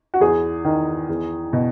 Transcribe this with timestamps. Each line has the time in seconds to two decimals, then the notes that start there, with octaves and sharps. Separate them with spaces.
0.14 F#4
0.21 E2 G#4
0.65 D#3
1.09 E2
1.53 B2